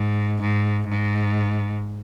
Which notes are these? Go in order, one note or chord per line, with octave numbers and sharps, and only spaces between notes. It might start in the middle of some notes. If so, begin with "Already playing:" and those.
Already playing: G#2
G#2
G#2